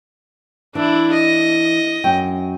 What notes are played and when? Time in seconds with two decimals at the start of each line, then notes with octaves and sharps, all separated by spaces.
0.75 E3 D4 E4
1.13 D#5
2.04 F#2 G5